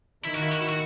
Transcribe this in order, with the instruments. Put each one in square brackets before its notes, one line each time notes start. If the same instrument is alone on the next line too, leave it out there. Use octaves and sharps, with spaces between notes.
[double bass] D#3 [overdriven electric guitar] E4
[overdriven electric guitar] F#4
E4
F#4
E4
F#4